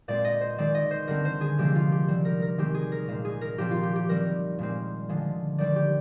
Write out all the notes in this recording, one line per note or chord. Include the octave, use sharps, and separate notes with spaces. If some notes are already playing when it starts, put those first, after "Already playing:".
A#2 G#3 C4 D5
D#5
C5
D#3 G#3 C4 D5
D#5
C5
D3 G3 C4 A#4
C5
G#4
C3 F3 G#3 C4 G4
F4
G4
D#3 G3 C4
A#4
A#4
D#3 G#3 C4 G4
G#4
A#4
A#2 G#3 C4
G#4
A#4
A#2 F3 C4 G4
F4
G4
G4
D#3 G3 C4 A#4
A#2 G#3 C4
D3 F3 G#3
D#3 G3 C4 D5
G4